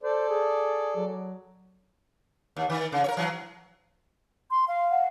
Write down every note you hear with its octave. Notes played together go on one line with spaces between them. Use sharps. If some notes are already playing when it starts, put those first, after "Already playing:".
A4 C5 D5
G#4
F#3
D#2
D#3
C#3
A#4 C#5
E3 F#3
C6
F5
F#5